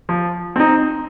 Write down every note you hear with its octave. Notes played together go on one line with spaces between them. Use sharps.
F3
C4 D#4